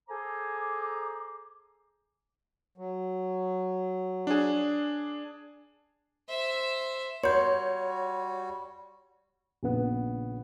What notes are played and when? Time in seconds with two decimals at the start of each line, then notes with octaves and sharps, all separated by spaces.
0.09 G#4 A4 C5 G#5 A#5 D6
2.78 F#3
4.27 D4 G#4
6.28 C5 E5
7.24 G3 F#4 C#5 C6 G6
9.63 A#1 C#3 B3